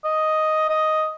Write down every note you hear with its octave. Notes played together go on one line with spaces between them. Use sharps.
D#5
D#5